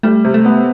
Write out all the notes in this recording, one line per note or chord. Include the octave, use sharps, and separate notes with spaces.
G3 A3
C3
A3
B3